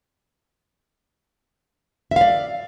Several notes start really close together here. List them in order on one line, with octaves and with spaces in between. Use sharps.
E5 F5 D5